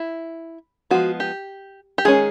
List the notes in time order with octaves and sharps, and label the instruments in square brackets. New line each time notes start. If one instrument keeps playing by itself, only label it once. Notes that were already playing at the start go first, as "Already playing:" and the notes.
Already playing: [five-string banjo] E4
F3 G#3 B3 F#4
G4
G4
D#3 G#3 C#4 G#4